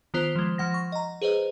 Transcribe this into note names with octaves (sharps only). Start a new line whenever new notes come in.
D#3 B3 F4 C5 C7 G7
F3 G#3
F3 F#5 A#6
C#6
D#5 A#5
G#4 B4 C5 D#5